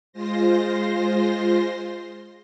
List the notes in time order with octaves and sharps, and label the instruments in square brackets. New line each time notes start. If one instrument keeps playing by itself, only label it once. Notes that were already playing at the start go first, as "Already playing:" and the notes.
[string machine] G#3 F4 C5 C6 A#6